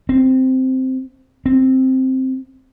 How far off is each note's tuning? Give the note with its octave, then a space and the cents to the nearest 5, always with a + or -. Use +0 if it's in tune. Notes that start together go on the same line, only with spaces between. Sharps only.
C4 -5
C4 +0